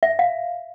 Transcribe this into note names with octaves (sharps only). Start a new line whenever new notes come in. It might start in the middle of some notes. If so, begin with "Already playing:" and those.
E5
F5